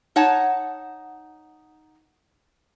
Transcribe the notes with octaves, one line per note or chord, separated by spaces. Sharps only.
D#4 C#5 F#5 A5